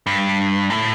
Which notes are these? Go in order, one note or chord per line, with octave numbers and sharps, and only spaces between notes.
G2
A2